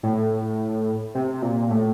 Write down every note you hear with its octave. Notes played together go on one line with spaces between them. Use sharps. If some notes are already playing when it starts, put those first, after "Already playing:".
A2
C3
A#2
A2